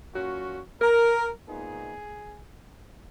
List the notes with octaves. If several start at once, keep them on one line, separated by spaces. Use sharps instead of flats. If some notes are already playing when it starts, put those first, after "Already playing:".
A#2 F#3 C#4 F#4
A#4
A#2 G#3 B3 D#4 G#4